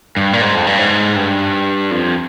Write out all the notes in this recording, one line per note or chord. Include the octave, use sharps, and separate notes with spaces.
G2
A#2
G#2
F2
G2
G#2
G2
F2